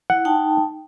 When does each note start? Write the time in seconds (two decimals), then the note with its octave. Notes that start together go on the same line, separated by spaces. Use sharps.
0.10 E4 F#5
0.25 D#4 G5 A5